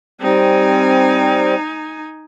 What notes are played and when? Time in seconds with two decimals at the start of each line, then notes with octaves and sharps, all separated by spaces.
0.21 G3 C4 D#4 G#5